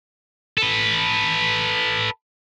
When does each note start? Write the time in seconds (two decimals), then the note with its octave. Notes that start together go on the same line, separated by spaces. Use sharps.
0.58 A4 B4